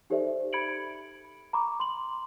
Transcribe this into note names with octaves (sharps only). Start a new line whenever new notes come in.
D#4 G4 A4 C5 D5 E5
B5 G#6 C#7 D7 F#7
A#5 B5 C#6 D6
C6 F#7